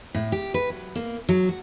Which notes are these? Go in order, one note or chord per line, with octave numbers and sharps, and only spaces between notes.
A2
G4
B4
F#3
A#3
F#3
F#4